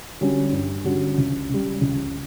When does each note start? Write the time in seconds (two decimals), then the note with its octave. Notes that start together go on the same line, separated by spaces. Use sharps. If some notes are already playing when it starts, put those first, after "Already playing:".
0.21 D3 G3 C#4 F#4
0.53 G2
0.85 D3 G3 C#4 F#4
1.18 C#2
1.49 C#3 G3
1.81 C#2